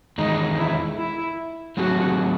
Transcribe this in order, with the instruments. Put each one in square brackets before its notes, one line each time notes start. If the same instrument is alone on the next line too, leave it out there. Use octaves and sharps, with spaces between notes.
[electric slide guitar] E2 D#3 G#3 [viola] D#4
[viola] E4
E4
[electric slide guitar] F#3 A3 C4 D#4 G#4 [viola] F#4